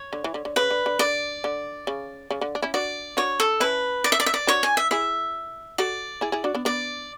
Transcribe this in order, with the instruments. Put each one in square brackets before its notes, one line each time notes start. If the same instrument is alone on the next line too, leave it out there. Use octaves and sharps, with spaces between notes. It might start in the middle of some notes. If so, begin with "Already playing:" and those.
Already playing: [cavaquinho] C#5
[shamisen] D3
E3
D3
D3
[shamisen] C#3 [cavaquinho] B4
[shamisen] D3
D3
[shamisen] D3 [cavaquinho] D5
[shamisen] D3
C#3
C#3
D3
D4
C#4 E4
[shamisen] D4 F#4 [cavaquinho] D5
[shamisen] D4 F#4 [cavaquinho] C#5
[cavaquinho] A4
[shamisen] C#4 E4 [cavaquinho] B4
[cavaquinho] D5
E5
D5
E5
D5
[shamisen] D4 F#4 [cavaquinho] C#5
[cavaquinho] G#5
E5
[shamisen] E4 G#4 [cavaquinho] E5
[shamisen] F#4 A4 [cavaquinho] D5
[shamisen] E4 G#4
E4 G#4
D4 F#4
B3 D4
[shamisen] B3 D4 [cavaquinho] D5